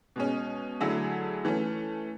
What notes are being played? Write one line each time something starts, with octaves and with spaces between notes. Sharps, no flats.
B2 G#3 C#4
D3 F#3 A3 E4 G#4
E3 A3 C#4